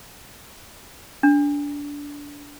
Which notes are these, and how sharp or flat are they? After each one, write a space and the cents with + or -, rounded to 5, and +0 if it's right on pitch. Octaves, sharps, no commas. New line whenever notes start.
D4 -20